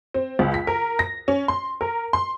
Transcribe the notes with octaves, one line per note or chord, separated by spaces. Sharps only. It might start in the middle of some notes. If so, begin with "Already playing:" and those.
C4
C#2
B6
A#4
A#6
C#4
C6
A#4
C6